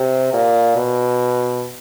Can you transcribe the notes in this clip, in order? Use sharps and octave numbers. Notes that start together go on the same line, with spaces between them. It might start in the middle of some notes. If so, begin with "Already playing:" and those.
Already playing: C3
A#2
B2